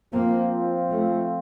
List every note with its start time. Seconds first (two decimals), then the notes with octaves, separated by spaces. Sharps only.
0.12 F3 A#3 C4 F4
0.89 A3